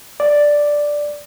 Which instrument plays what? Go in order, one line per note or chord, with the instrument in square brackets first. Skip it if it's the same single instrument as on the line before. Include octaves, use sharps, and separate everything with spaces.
[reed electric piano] D5